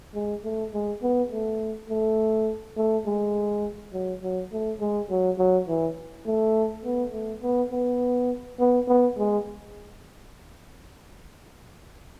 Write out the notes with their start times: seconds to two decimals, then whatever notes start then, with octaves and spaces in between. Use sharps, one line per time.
0.14 G#3
0.44 A3
0.74 G#3
1.02 B3
1.31 A3
1.89 A3
2.77 A3
3.06 G#3
3.93 F#3
4.22 F#3
4.52 A3
4.80 G#3
5.10 F#3
5.38 F#3
5.68 E3
6.26 A3
6.84 B3
7.13 A3
7.42 B3
7.71 B3
8.59 B3
8.88 B3
9.17 G#3